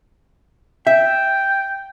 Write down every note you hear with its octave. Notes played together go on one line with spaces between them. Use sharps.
E5 G5